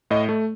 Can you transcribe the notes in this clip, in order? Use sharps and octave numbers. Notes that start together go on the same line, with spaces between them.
A2 D#5
A3